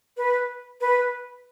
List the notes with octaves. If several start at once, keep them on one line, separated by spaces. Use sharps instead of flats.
B4
B4